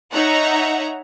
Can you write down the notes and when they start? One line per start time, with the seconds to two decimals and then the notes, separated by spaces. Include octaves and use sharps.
0.13 D#4 C#5 E5 F#5 A#5